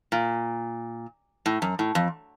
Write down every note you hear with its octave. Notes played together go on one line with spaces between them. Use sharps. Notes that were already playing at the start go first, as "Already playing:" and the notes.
A#2
A2
F#2
A2
F2